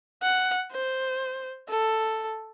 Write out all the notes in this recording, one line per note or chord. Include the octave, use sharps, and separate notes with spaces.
F#5
C5
A4